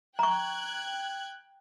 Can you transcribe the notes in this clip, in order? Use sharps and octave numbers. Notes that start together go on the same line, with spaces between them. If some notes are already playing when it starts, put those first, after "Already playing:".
G5 A#5 C#6 F#6 G#6